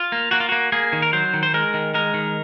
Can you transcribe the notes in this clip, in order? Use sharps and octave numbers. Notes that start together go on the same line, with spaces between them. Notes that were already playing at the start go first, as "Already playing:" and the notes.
Already playing: F4
A#3
A#3 F#4
F4
A#3 F#4
A#3 G#4
D#3
A#4
F#3 C5
D#3
C5
G#3 A#4
D#3
G#3 A#4
D#3